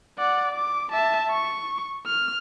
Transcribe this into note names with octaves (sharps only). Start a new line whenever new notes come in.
D5 F#5
D6
E5 A5
C#6
F6